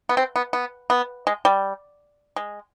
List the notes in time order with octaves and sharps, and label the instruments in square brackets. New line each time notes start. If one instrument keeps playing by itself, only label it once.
[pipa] B3
C4
B3
B3
B3
G#3
G3
G#3